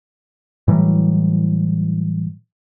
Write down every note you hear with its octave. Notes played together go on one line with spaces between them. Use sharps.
A2 E3 F#3 G3